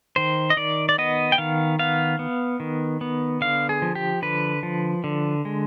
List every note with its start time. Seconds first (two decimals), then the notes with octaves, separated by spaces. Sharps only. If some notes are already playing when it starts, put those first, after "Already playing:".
0.16 D#3 C5
0.50 D#5
0.57 D#3 D5
0.89 D5
0.98 B3 D#5
1.32 G5
1.38 D#3 F5
1.79 B3 F5
2.19 B3
2.60 D#3
3.01 B3
3.41 D3 F5
3.69 G#4
3.82 F3
3.95 G4
4.22 D3 B4
4.63 F3
5.04 D3
5.45 G#3